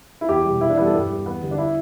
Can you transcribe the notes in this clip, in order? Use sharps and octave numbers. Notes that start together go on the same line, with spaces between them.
E4
E2 G4
B2 G3
E2 E4
D4
E3 G3 B3
A4
G2 G4
G3
E2 B3
D3 G3
D4
E4